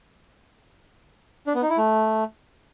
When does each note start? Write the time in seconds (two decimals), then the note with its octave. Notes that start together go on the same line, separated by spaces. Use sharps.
1.47 D4
1.55 B3
1.62 D#4
1.70 E4
1.77 A3